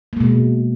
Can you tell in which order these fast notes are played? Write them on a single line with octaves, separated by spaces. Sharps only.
A#3 G#3 B2